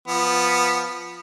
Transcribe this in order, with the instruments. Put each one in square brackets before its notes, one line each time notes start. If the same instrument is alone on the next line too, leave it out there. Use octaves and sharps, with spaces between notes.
[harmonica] F3 B3